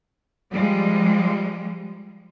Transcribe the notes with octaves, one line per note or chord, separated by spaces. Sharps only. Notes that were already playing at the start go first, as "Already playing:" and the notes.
F3 G3 G#3